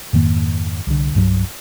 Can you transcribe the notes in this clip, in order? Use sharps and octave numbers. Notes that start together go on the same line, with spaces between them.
F2 G#2 D#3 A#3
C2 D3
C2 G2 E3 F#3